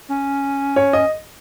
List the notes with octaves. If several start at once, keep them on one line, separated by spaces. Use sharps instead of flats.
C#4
C#5
D#5